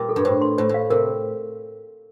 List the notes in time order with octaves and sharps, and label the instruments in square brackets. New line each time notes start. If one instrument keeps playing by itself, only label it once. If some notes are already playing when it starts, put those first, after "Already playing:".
Already playing: [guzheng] A#2 G3
[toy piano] A4
[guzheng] G2
[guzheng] A2 [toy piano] C5
[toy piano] C6
[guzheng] A2 [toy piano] C5
[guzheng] A2
[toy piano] F5
[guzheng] C3 [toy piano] A#4